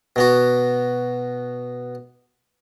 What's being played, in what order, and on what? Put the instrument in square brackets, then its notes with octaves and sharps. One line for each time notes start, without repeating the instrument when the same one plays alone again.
[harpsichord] B2 B3 F#4